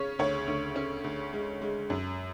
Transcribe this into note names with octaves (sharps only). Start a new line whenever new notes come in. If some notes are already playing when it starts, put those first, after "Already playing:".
Already playing: C#3 C#4 C#5
D2 C#5
D2
C#4
D2
G#3
G#3
F#2